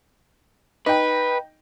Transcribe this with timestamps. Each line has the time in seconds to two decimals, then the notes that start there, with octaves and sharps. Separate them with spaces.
0.86 D#4 B4 G5